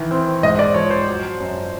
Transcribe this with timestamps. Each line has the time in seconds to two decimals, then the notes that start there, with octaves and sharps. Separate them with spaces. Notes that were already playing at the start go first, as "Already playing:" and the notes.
Already playing: D#3 E3
0.11 C4
0.43 G#2 D#5
0.59 D5
0.74 F3 C#5
0.91 C5
1.08 F#3
1.40 F#2